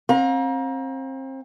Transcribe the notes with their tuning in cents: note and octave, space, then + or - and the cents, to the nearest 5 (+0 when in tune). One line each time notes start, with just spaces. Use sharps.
C4 +30 F5 +40 A#5 +30